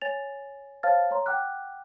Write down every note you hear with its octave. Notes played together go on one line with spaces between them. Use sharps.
C#5 G#5 A6 F7
C5 C#5 F5 A5 F6 A6
C#5 A#5 C6
F#5 G5 D6 F6 F#6